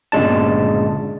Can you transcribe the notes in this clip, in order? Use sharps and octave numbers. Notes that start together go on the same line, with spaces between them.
G1 A#2 C#3 G#3 D4 A5